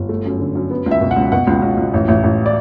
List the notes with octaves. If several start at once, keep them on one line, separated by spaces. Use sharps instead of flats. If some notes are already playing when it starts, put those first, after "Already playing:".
Already playing: G1
A3
F#2
D3
F#2
B3
C#2
E5
B2
F#5
C#2
B2 F#5
C#2
C#2
C#2
A1
A1
A1
D5